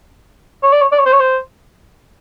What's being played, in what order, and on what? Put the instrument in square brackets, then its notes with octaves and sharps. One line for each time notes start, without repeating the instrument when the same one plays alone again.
[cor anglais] C#5
D5
C#5
D5
C#5
C5
C#5
C5